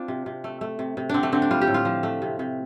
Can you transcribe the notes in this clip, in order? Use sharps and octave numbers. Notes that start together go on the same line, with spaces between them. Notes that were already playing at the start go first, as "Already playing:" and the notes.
Already playing: C4 D4 F4
C3
C3
A3
A3
C3
C3
D3 C4 D4
A3
D3 C4
D4
G3 F4
G4
A2
F4
F3
A3
C3
C3